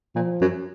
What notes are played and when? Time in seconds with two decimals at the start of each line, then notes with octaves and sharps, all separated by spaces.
0.16 A#2 F3
0.41 F#2